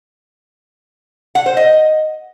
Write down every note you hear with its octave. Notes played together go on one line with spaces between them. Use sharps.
F#5
C5
D#5